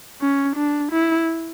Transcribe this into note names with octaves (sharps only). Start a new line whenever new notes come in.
C#4
D4
E4